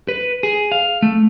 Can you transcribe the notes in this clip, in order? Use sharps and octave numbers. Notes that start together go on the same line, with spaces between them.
B4
G#4
F5
A3